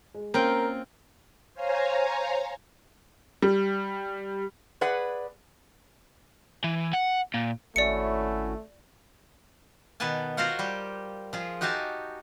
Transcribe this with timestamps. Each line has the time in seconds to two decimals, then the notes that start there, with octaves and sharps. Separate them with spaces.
0.14 G#3
0.34 A#3 C4 C#4 F4 A#4 C5 G5
1.54 C5 C#5 F5 G#5 A#5
3.42 G3
4.81 G#4 B4 D5 F#5
6.64 E3
6.93 F#5
7.34 A#2
7.76 G#1 A3 C#4 E4 F#4 D5 C#7
10.00 B2 D#3 B3 B4 G#5 A5
10.37 F4 F#4 A#4 C5 F5 F#5
10.59 G3 G4
11.33 F3 F4 G#4
11.61 D#4 F#4 G4 F5 G#5 A5